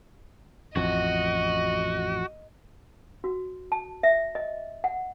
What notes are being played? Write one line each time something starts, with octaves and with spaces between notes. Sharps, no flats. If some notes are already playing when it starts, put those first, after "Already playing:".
A1 F2 F#4 D#5
F#4
A5
E5
D#5
F#5